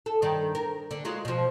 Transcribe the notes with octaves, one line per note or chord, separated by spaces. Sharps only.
A4
G2 D#3
A#4
D3
F#3 G#3 F4
B2 F3